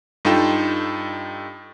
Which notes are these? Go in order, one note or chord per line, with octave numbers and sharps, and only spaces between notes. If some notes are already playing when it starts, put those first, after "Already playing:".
G2 D#4 F4 A4 G5 E7